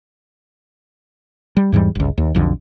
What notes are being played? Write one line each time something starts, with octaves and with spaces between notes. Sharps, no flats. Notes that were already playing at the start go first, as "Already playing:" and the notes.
G3
E2 G#2 E3 G3
G1 C#2
D#2
B1 F2 D3